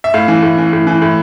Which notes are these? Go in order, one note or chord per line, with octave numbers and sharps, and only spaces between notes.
E5
A2 F5
E3
A2
E3
A2
E3
A2